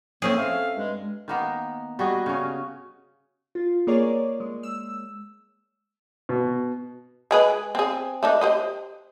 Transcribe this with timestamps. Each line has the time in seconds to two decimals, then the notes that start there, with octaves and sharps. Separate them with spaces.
0.22 A2 A#3 C4 C#4 G#4
0.37 A4 E5 F5
0.76 G2 G#3
1.28 D#3 A#3 B3
1.99 G3 F#4 G#4 D#5
2.26 C#3 C#4
3.55 F4
3.87 A#3 G#4 A#4 C#5 D5
4.40 G#3
4.63 E6
6.29 B2
7.31 G#3 G#4 B4
7.75 C4 G#4
8.23 A3 D4 D#4
8.41 G4 C5 D#5